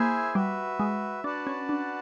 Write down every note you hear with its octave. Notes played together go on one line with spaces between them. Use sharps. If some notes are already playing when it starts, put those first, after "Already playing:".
Already playing: A#3 E4 G#4 C5 E5 G#5
G3 F#4 B4 E5
G#3
D4 F#4 B4 D5 F#5 A5
C#4
D4